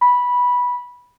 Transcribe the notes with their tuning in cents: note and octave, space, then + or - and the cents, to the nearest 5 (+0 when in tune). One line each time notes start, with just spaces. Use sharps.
B5 -10